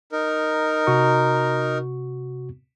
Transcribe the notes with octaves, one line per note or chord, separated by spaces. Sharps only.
D#4 A#4
C3 F#4 C#6